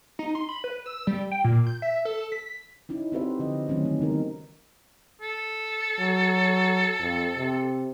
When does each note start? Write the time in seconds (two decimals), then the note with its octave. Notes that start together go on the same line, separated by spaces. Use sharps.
0.19 D#4
0.35 C6
0.49 B5
0.64 B4
0.86 E6
1.07 G3
1.32 G5
1.44 A#2
1.67 G6
1.82 E5
2.05 A4
2.32 B6
2.89 C#4 D#4 E4
3.12 C4 F#4 G4 B4 C5 E5
3.40 D3 F3 D#5
3.69 D#3 F#3 A3 C4 C#4
3.85 G3 C4
3.99 C#3 B3 D#4 A#4
5.21 A4
5.99 F#3
7.00 F2
7.37 C3